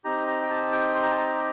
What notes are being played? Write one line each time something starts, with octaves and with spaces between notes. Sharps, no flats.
C4 D#4 G4 A#5
A#5
G5
A5
G5
C6
A#5
A5
A#5